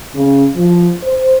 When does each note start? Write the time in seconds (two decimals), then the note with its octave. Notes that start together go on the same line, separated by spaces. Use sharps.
0.15 C#3
0.55 F3
1.02 C5